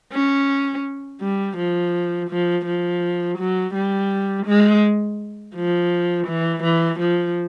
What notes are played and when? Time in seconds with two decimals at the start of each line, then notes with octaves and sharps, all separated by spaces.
0.13 C#4
1.21 G3
1.57 F3
2.30 F3
2.66 F3
3.38 F#3
3.74 G3
4.46 G#3
5.55 F3
6.27 E3
6.63 E3
7.00 F3